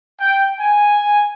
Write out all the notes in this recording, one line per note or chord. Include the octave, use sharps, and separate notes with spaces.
G5
G#5